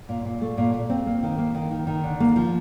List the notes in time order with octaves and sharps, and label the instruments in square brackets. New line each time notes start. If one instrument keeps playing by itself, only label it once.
[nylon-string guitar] A#2
A#2
A3
A#2
A#2
C4
A#3
D#3
A#3
D#3
D#3
D#3
D3
A#3
F3